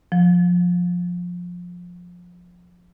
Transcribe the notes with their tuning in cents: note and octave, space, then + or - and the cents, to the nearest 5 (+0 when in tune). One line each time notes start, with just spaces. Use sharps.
F3 +20